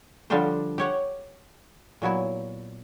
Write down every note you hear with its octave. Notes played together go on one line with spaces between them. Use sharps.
D3 F3 G3 D4 G4 C5
G4 C#5 F#5
A#2 F#3 B3 E4